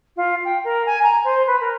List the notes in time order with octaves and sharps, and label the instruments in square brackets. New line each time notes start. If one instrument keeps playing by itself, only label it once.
[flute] F4
G5
A#4
G#5
A#5
C5
B4
A#4